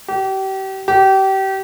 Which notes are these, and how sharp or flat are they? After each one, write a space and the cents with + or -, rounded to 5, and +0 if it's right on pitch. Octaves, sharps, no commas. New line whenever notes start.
G4 -35
G4 -30